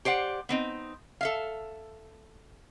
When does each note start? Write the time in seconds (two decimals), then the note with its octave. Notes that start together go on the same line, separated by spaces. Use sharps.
0.05 G4 C5 D5 F#5
0.49 B3 C4 D#4
1.21 A4 E5 F5